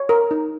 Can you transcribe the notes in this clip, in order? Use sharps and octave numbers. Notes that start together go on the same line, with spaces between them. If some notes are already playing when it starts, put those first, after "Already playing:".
Already playing: C#5
A#4
D#4